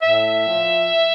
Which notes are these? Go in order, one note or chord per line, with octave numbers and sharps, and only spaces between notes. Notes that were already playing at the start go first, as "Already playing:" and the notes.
A2 E5
F3